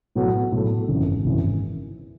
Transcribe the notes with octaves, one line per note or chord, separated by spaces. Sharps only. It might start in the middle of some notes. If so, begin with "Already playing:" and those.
A2 F#3 B3 F#4 A4
A2 F#3 B3 F#4 A4
G#1 F#2 C#3 E3
G#1 F#2 C#3 E3